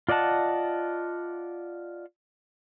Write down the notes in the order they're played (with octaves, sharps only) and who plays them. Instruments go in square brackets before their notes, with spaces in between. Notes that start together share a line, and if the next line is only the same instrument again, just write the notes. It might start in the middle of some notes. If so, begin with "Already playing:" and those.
[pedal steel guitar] F4 D5 D#5 F#5 A5